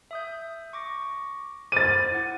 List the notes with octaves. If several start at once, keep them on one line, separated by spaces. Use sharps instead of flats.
E5 D#6 G6
C#6 D6 A#6
C5 D6 F6 A6 D#7
E4 F#5